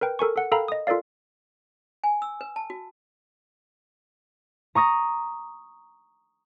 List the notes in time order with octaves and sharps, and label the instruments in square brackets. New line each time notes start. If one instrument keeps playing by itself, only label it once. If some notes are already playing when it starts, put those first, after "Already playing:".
[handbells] A#4 B4 G5
A4 A#4 G#5 C#6
A4 F#5
A4 A#4 F5 G5 A#5 B5
D#5 D#6
F4 A4 A#4 D5 F5
[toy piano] G#5
E6
B4
A5
F#4
[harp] A#5 C#6 D#6 A#6